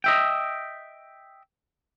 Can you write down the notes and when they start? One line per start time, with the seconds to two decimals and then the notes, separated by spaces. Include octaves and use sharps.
0.04 D#5 E5 G5